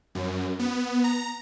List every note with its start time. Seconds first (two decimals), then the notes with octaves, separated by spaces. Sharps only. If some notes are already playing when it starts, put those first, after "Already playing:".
0.15 F#2
0.59 B3
1.04 A#5